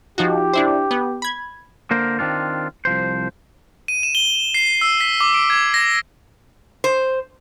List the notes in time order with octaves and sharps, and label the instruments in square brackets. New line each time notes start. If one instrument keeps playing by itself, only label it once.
[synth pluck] F3 D#4 F#4 [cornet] G4
[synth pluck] D4 E4 C5
B3
B5 G#6
[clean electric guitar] D3 A#3 A#4 C5
D#3 C4 D4 F4
C2 F3 C5
[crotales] D#7
E7
G7
C7
E6
B6
D6
D7
G#6
A#6
[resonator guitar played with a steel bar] C5